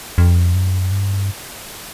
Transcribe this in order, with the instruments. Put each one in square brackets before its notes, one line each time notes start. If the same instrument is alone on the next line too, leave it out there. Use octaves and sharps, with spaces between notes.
[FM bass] F2
F#2
G2